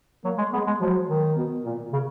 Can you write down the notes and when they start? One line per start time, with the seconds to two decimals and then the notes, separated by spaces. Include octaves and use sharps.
0.25 F#3 A#3
0.38 G#3
0.53 G#3 B3
0.67 G#3
0.80 F3 F#3
1.08 D#3
1.36 B2
1.64 A#2
1.93 C#3